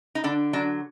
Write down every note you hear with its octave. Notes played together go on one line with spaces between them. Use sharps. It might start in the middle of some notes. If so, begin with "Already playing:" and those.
D#4
D3 D4
F#3 D4